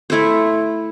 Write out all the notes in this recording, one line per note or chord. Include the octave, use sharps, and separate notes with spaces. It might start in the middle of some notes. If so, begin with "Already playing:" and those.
A3 E4 A4 C5